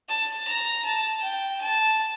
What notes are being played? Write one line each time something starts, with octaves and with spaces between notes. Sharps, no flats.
A5
A#5
A5
G5
A5